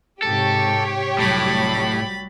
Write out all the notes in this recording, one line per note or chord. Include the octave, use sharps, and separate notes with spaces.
G#2 C3 G4 A4 C#5
F1 A2 F#3 G3 B5 A6